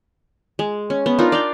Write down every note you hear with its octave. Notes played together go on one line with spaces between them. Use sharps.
G#3
C#4
B3
D4 D#4 F4 A#4
D5 F5 G5